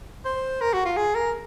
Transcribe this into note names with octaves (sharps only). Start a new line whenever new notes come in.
C5
A#4
F#4
F4
G#4
A#4